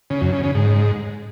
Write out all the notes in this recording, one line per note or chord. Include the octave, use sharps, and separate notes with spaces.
C#3
F#2
C#3
C#3
G#2